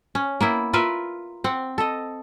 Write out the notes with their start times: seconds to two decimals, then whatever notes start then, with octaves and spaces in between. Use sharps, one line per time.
0.15 C#4
0.41 A#3 B3 E4
0.73 F4 A#4 B4 E5
1.44 C4 F#5
1.78 A4 D#5